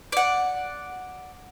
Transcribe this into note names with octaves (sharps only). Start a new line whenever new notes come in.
D5 F#5